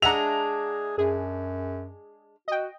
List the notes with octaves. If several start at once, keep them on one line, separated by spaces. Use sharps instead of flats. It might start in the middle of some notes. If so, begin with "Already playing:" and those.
G#3 D4 G#4 E5 F#5 A#5 F7
F#2 G#4
F#4 D#5 G5